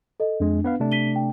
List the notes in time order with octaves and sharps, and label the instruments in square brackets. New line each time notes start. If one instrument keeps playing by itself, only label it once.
[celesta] A4 D#5
[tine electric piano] F2 G#3 [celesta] D4
[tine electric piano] B3 B4 F5
C3 A3 D4
[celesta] B6 D#7 G7
G5